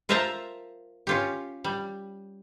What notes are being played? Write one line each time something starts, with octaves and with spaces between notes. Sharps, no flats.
F4 A#4 C5 E5 A5 A#5
C#4 F4 G4
G3